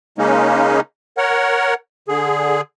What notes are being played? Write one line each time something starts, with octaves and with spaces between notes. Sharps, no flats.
C#3 G#3 A#3 C#4 D#4
A#4 C#5 F#5
D3 G#4